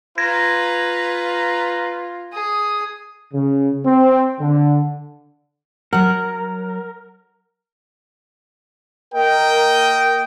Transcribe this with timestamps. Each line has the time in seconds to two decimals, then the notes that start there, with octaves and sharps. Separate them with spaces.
0.18 F4 B4 A#5 G#6 A#6
2.32 G#4 D#6
3.33 C#3
3.85 C4
4.40 D3
5.93 F#3 A#4 F#5
9.15 A#3 A#4 D#5 G5